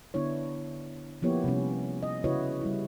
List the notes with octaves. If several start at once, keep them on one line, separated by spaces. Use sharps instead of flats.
D3 B3 D4 E4 C#5
F3 A#3 B3 E4 G4 C#5
C3 G3 C#4
D#5
C#3 E4 F#4 B4 C#5 D#5
G3 E4